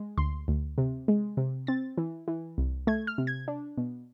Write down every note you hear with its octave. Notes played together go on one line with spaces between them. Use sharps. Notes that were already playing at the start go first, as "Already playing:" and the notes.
Already playing: G#3
D2 C6
D2
C3
G#3
C3
C4 A6
E3
E3
C2
A3 G#6
F6
C3
G#6
D4
B2